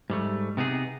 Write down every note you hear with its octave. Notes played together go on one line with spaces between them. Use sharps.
G#2 G3 A3
C3 B3 D#4 G#4